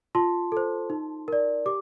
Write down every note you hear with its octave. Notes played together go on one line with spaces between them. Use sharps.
F4 A5 C6
A4 C5
D#4
A#4 D5
G4 D6